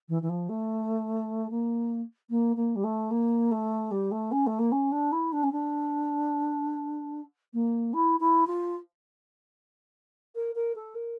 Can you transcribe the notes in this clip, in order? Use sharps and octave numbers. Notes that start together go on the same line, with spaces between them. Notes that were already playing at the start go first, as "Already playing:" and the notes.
E3
E3
F3
A3
A#3
A#3
A#3
G3
A3
A#3
A3
G3
A3
C#4
A3
A#3
C#4
D4
E4
D4
C#4
D4
A#3
E4
E4
F4
A#4
A#4
A4
A#4